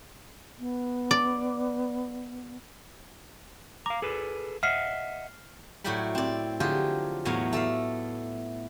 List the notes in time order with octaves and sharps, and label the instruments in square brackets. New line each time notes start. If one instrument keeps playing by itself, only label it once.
[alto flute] B3
[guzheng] D5
[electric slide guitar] F5 A#5 [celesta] D6
[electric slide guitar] G#4 A4 B4
[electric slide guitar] D#5 E5 F#5 [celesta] F6 C7
[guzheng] A2 F#3 E4 D5 G5 B5
C4 D5
D3 F3 F#3 F4 G4 G#4
E2 A2 F#3 B3 F5 F#5
A3 A4 D5 F5